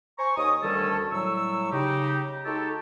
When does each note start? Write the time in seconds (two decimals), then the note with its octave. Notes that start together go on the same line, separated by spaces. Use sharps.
0.18 C5 G#5 A#5 C#6
0.37 D#2 C#5 D#5 D#6
0.63 D2 D#3 G3 C#4 A4
1.11 A2 F#3 G3 C#6 E6
1.72 C#3 D#4 G4
2.45 G#3 D#4 F#4 G4 A4